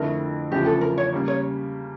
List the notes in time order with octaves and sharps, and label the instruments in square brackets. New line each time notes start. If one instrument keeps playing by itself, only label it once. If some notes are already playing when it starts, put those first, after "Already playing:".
Already playing: [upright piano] F2 D3 A3 E4 [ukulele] A#4
[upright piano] E2 C#3 F3 A3 D4 [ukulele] G4
[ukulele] A4
A#4
C#5
[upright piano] C#3 G3 A#3
[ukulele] C#5